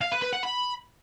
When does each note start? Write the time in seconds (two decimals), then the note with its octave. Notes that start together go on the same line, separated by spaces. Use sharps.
0.01 F5
0.12 B4
0.22 B4
0.33 F#5
0.43 B5